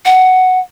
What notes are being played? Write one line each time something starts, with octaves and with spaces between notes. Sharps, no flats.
F#5